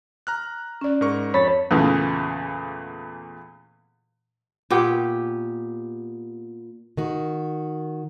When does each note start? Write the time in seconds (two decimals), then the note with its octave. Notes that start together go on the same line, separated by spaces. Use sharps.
0.27 A#5 F6 F#6
0.81 C#4 D5
1.01 G#2 A#4 C#6
1.34 F2 C#5 B5 A6
1.71 E2 A#2 C#3 E3 A3
4.70 A#2 B3 G4
6.97 D#3 F#4